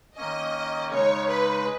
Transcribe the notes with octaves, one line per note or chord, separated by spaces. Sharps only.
D#3 A#3 C#4 D#5
C#3 G#3 D#4 C#5
B4